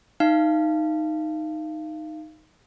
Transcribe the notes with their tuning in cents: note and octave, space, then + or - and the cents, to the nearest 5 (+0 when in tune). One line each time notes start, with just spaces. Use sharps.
D#4 +0 F5 -25